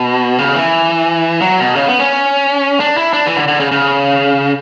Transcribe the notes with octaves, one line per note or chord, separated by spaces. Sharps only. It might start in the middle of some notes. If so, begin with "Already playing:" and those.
Already playing: B2
C#3
E3
F#3
B2
C#3
B3
C#4
D4
E4
D4
E3
D3
D3
C#3
C#3